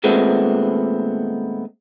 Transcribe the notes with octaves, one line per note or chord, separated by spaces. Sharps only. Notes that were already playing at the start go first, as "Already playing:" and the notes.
D#2 A#2 G#3 A3 B3 C4